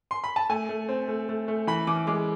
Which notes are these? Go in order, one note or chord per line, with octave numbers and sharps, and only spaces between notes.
C6
B5
A5
A3 G#5
A3
C4
A3
A3
A3
E3 B5
E3 D6
G#3 D6